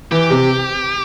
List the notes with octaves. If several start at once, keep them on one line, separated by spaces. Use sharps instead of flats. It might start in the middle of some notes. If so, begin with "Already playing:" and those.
E3 G4
C3